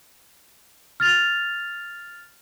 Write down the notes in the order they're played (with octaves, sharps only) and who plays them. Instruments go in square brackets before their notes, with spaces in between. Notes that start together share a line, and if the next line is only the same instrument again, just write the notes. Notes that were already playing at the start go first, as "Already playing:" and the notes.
[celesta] F6 A6 F7